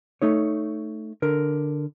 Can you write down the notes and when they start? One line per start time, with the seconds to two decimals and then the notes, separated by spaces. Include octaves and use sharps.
0.22 A3 D#4 C#5
1.22 D3 A#4